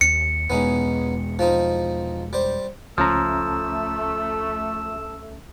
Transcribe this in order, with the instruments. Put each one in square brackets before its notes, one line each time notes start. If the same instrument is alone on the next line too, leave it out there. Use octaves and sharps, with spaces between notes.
[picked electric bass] D#2 [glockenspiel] C#7
[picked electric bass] E2 B2 G#3 [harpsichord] B3 C#4 D#4
[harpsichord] F3 C4 D#4
G3 C5
[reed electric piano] C#2 C#4 A#5 [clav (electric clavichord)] F3 [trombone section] A3 [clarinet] E6